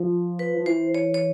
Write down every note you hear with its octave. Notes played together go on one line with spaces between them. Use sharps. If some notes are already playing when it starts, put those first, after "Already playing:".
Already playing: F3
B4
F3
E3 C5
C#5
C#5